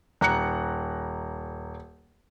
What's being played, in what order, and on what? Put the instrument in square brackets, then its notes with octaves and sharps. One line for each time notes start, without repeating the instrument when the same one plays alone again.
[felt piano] D#1 A#5 F#6 C#7